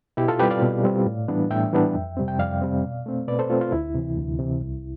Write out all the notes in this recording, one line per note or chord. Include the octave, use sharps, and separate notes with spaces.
B2 E4 G4
F4 A4
G3 C4 G4 B4
D5 F5
B2
G3 C4
A2
E3 G3 B3 D4
A2 E5 G5
E3 G3 B3 D4
F2
C3 G3 C4
G5
F2 D5 F5
C3 G3 C4
B2
A3 C4
B2 B4 D5
A4 C5
A3 C4 F4
F4
D2 E4
C3 E3
D2
C3 E3
C2